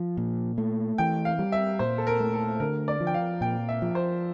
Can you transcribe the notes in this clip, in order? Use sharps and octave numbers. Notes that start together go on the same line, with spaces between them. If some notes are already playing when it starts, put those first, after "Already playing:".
Already playing: F3
A#2
A3
E3 G5
F5
G3
E5
A#2 C5
A4
A#4
A3
A4
D3 A#4
D5
F3
G5
F5
A#2 G5
E5
F3
C5